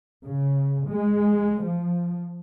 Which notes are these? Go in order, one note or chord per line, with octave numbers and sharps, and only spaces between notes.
C#3
G#3
F3